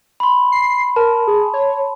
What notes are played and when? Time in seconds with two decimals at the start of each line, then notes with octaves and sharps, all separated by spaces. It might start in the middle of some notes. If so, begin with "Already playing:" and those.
0.20 B5 C6
0.52 C7
0.96 A#4 A5
1.27 G#4
1.54 C#5